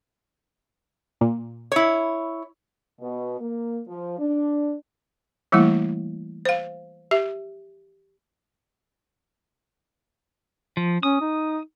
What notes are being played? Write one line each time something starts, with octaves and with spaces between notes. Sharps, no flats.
A#2
E4 C#5
B2
A#3
F3
D4
E3 G3 A3 A#3 E4
C5 F5
G4 E5
F3
C#4 D#6
D#4